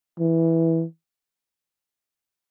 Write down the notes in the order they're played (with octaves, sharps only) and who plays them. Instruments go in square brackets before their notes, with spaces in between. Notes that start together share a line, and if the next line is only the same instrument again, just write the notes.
[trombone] E3